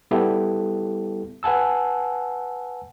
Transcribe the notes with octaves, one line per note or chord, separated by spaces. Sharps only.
G3 B3 E4 G4 A4
B4 F#5 G#5 A5 E6